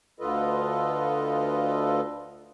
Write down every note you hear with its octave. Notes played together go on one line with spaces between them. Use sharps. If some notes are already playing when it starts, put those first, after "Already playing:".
D2 D3 F4 A4 B4 D#5